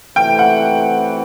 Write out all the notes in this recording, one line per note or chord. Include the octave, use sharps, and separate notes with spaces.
C3 E3 A3 G5
F#5